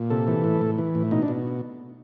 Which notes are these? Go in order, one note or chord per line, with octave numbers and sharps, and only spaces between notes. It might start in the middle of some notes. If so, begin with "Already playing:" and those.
Already playing: A#2
C3 A4
E3
A2
A2
E3
A2
B2 D#4
D4
B2